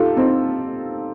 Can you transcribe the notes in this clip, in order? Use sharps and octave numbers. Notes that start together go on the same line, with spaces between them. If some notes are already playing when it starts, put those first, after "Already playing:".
Already playing: D#4 F4 G4 A4
C4 D#4